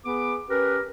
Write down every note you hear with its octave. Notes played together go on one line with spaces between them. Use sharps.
B3 G#4 B4 D6
C#4 G4 A#4 B4